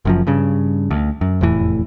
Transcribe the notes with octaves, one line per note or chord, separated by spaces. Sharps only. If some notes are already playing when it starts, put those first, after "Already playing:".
F#1 F#2 F3
G2 C#3
D2
F#2
F1 E2 A2 E3